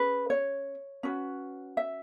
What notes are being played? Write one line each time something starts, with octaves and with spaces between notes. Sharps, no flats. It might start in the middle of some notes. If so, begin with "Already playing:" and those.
Already playing: C#4 G#4 B4
C#5
C#4 F#4 B4
E5